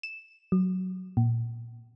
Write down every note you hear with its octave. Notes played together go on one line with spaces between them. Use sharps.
E7
F#3
A#2